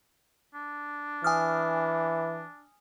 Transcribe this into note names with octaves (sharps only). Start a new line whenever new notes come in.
D4
E3 G#5 D#6 F6